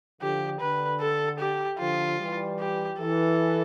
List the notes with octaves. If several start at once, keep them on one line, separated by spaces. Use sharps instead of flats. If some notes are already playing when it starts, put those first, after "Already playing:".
D3 F3 G4
D3 B4
A4
G4
D3 F3 F4
E3 G3
G4
E3 A4